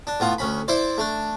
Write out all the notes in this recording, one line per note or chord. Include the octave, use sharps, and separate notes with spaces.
D4
A2 B3 F4
D2 C#4 B5
E4 C5 D5
A3 D4